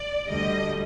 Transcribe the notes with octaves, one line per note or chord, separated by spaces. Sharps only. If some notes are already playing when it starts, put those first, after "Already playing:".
Already playing: D5
D2 D3 G3 D#5